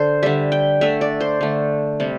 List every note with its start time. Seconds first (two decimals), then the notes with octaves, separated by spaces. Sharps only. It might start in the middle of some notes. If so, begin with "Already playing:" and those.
Already playing: D3 A4 C5
0.23 D3 G3 E5
0.52 G5
0.81 D3 A3 E5
1.01 D5
1.20 C5
1.41 D3 A3
2.00 C3 G3